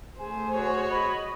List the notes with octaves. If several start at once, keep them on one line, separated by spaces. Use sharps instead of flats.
A3 G#4 C5 G#5
F#4 C#5
D#5 B5